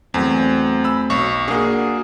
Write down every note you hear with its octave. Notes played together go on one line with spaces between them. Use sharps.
E2 F#3 A3 C4
B5 E6
B1 C#6
A#3 D4 F#4 G#4